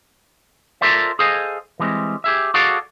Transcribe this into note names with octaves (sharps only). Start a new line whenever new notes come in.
F4 A4 A#4 C5 D5 E5
G#4 A4 C5 D#5 F5 G#5
E3 G3 G#3 A#3 C4
G4 G#4 E5
F#4 G#4 A4 D5 F5 F#5